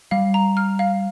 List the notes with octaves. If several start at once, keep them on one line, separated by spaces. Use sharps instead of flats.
G3 F5
A#5
F6
F5